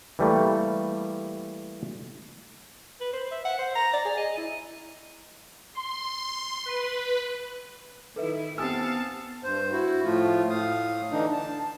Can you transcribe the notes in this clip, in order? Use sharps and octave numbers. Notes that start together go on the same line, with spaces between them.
E3 G3 A3 A#3
B4
C5
E5
F#5
C5
A#5
D5
G#4
D#5
E4
C6
B4
D#3 E4 A4 B4 E5
B3 C4 G4 F5 G#5 A5 D#6 E6
G2 C5
E4 F#4
A2 F3 A3 F4
A2 F5 D#6
D3 E3 D4 D#4
A5